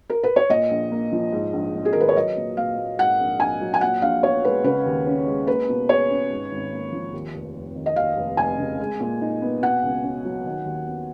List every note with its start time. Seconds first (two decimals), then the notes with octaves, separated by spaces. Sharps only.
0.10 A#4
0.23 B4
0.36 C#5
0.50 A#2 D#5
0.71 A#1
0.92 A#3
1.12 F3
1.32 G#2
1.53 A#1
1.75 A#1
1.85 G#4
1.93 D#3 A#4
2.00 B4
2.09 C#5
2.16 F#3 D#5
2.37 A#2
2.57 A#2 F5
2.78 A#3
2.99 G#2 F#5
3.20 A#1
3.40 A#1 G#5
3.61 F#3
3.74 G#5
3.81 A#2 F#5
4.02 A#1 F5
4.23 B3 C#5
4.44 G#3 B4
4.64 C#3 B4
4.86 D#2
5.07 C#4
5.26 G#3
5.47 A#3 B4
5.69 B2
5.89 G#4 C#5
6.10 C#4
6.31 G#2
6.52 G#1
6.73 A#3
6.92 F3
7.13 D#2
7.34 F1
7.56 F1
7.76 D#3
7.86 D#5
7.96 D#2 F5
8.17 F1
8.37 F1 G#5
8.58 C#3
8.80 G#3
9.00 A#2
9.21 D#4
9.42 B3
9.62 B2 F#5
9.83 C#2
10.04 C#4
10.25 F#3
10.46 D#3
10.66 D#2
10.87 B3